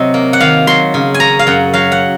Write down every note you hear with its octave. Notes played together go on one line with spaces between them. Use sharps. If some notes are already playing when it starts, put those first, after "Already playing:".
Already playing: C3 F#3 D#5
A#3
F#5
D#3 F5
F#3 C6
C#3
G#5
C#4 A#5
F5
F#2 F#5
F#3 F5
F#5